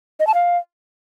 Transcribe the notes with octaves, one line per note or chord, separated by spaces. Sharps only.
D#5
A5
F5